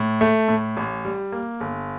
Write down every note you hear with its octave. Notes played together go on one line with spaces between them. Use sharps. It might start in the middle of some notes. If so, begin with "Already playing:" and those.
Already playing: A2
A3
A2
A1
G3
A#3
G1